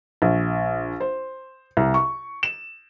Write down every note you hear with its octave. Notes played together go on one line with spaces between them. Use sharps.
A#1
C5
C2
C#6
E7